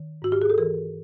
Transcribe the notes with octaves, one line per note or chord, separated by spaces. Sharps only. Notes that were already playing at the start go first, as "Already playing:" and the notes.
Already playing: D#3
G#2 F#4
G4
G#4
A4
E3 A#4